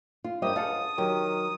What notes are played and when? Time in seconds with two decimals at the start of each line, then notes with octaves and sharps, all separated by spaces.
0.24 F4
0.42 G2 A#3 G4 C5 D#5 E5 D#6
0.56 C#2 A4 D#5 F5 F#5 A5
0.98 D#3 F#3 G4